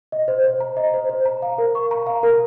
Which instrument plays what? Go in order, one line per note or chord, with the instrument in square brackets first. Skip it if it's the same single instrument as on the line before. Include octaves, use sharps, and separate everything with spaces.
[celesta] D#5
C5
C5
A#5
D#5
C5
C5
A#5
F5
A#4
C#6
A#5
F5
A#4